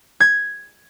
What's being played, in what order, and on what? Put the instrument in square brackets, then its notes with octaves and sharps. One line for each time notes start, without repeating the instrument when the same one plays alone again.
[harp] G#6